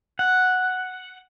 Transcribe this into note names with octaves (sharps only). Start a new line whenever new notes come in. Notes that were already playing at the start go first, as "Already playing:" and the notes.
F#5